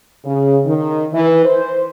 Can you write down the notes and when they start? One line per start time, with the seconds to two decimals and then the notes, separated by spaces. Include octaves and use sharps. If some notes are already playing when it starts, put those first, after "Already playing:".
0.25 C#3
0.66 D#3
1.13 E3
1.45 C5